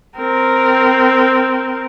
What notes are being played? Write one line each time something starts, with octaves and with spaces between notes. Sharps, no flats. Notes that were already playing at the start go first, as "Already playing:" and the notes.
C4 A#4